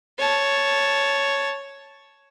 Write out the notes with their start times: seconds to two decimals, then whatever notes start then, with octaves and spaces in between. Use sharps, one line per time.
0.19 C#5 A5